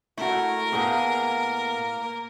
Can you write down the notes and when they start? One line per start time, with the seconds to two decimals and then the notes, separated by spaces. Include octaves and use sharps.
0.17 A3 E4 F#4 A#4
0.72 A2 A#3 B3 G#4